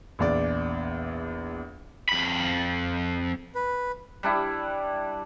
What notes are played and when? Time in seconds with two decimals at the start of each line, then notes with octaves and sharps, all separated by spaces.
0.19 A#1 E2 D5
2.09 F2 B5
3.55 B4
4.23 G3 D4 E4